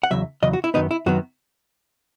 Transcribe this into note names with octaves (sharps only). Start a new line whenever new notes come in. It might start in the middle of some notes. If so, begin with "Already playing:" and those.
F#5
E2 C#3 F#3 E5
E2 C#3 F#3 D#5
F#4
E4
F#2 D#3 F#3 B3 D#4
E4
F#2 D#3 F#3 B3 F#4